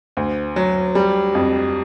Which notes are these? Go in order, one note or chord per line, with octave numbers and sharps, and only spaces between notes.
D2
F#3
G3
F2